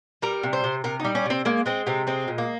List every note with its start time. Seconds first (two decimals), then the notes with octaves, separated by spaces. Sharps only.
0.22 G3 A#4
0.43 C3
0.53 C5
0.64 C3
0.84 C3 A#4
1.00 G3 D#4
1.15 C#4
1.26 C3 C4
1.45 G#3 A#3
1.66 G#3 C4
1.87 C3 C4
2.07 G#3 C4
2.28 A#2
2.38 A#3